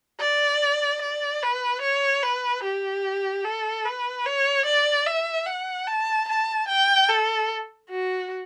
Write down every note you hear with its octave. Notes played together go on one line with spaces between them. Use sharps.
D5
D5
B4
C#5
B4
G4
A4
B4
C#5
D5
E5
F#5
A5
A5
G5
A4
F#4